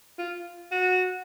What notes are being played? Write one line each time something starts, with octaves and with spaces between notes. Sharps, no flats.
F4
F#4